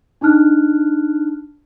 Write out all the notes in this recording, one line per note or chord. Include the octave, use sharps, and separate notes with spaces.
D4 D#4 A5 F6 F#6